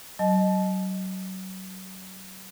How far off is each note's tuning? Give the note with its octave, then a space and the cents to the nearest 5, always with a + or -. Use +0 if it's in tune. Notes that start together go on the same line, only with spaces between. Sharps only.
F#3 +30 D#5 +0 A5 -30